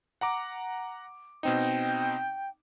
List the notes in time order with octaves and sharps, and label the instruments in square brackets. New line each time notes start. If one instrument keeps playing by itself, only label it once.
[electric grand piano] F#5 A#5 D6
[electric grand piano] B2 C4 D#4 [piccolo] G5